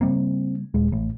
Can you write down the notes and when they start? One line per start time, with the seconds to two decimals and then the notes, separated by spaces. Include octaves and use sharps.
0.01 C#3 G3 A#3 C4
0.74 D#1 G#3
0.92 A1 A2